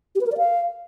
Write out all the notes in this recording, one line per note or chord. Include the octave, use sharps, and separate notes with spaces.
G4
B4
A#4
D5
F5